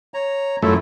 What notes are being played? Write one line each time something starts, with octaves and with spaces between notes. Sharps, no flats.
C#5 A#5
F#2 A3 E4 F4